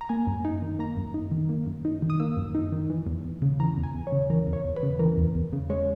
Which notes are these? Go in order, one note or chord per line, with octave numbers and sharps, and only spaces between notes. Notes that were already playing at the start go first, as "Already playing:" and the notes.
A#5
A#3 G#5
F#2
D#4
D#3
A#3 A#5
F#2
D#4
D#3
A#3
F#2
D#4
D#3
D#6
A#3 E6
F#2
D#4
D#3
E3
E2
E2
C#3
E3 A#5
E2
G#5
E2
C#5
C#3
E3 A#4
E2
C#5
E2
B4
C#3
E3 A#4
E2
E2
C#3
G#3 C#5